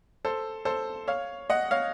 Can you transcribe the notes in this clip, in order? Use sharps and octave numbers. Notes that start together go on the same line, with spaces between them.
A4 C5
A4 C5
C#5 F5
D#5 F#5
C#5 F5